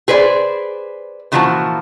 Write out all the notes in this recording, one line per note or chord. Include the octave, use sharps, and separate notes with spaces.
G#4 B4 C5 D5
A#2 D3 E3 F3 F#4 A5